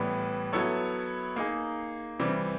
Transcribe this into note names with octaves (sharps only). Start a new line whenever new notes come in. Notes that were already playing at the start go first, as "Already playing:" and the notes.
Already playing: A2 E3 G3 B3
F#3 B3 E4 A4 C#5
A#3 D#4 G#4
C3 E3 G3 C4